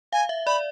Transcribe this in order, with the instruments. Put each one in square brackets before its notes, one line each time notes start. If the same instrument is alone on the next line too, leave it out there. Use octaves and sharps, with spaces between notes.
[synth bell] F5 [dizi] G#5
[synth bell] E5
[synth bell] D5 [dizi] B5